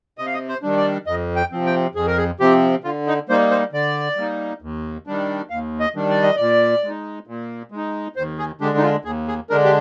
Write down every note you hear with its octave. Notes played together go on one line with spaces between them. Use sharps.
C3 D#5
F5
D#5
C5
D#3 G3 D4
D5
F2 D#5
G5
C3 F3 C4
G5
F2 G#4
A#4
G#4
C3 F3 C4 G4
D3 F4
D#4
G3 A#3 D#4 C5
C5
D3 D5
G3 A#3 D#4
D#2
D#3 G3 D4
D#2 F5
D#5
D#3 G3 D4
D5
D#5
A#2 D5
G#3 D#4
A#2
G#3 D#4
D#2 C5
G#4
D3 G#3 D4 G4
D#4
F4
D#2 G#4
G#4
D3 G#3 D4 A#4
G4